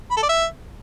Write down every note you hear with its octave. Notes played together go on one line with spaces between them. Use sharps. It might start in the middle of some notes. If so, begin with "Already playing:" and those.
B5
A4
D5
E5